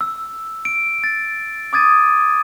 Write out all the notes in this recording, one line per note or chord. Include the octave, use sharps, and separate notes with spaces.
E6
D7
A6
D6 D#6 G#6 A6 D#7